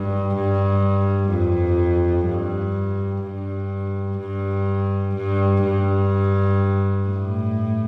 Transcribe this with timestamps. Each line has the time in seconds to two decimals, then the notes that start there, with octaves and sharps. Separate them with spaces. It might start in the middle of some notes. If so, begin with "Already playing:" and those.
Already playing: G2
0.35 G2
1.32 F2
2.28 G2
3.23 G2
4.19 G2
5.16 G2
5.64 G2
7.08 A2